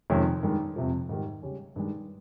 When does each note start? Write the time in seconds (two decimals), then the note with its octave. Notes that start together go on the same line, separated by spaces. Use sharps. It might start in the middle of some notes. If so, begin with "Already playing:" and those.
0.10 F2 C3 D#3 G#3 C#4
0.43 G2 D#3 G#3
0.76 F2 C3 F3
1.09 G#2 D#3 G3
1.42 C#3 G3 C#4
1.76 G2 D#3 G#3